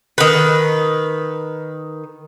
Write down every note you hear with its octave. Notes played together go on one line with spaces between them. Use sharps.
D#3 B4